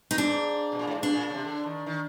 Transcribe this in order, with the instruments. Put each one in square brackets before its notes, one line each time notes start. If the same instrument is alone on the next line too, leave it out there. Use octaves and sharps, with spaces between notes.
[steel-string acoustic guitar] D#4
[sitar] G#2 [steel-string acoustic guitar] D4
[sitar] B2
A#2
A2
G#2
[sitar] G2 [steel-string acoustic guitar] D4
[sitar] A#2
C#3
C3
D3
D#3
D#3